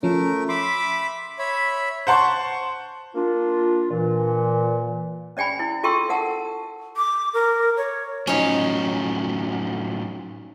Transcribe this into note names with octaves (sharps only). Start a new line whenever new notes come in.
F3 A3 C#4 A#4
E5 B5 C6 D6
C#5 E5 B5
C5 F#5 A5 C6 C#6
A#3 D4 F4
A#2 E3
C#4 D5 G5 G#5 B5
E4
F4 A4 G5 C6 C#6 E6
A4 A#4 F#5 A5
D6
A#4
C#5
A2 F3 F#3 C#4 D#4